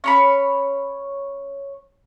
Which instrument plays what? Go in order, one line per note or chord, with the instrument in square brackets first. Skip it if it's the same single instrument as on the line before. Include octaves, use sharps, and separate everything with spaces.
[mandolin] C#4 C#5 B5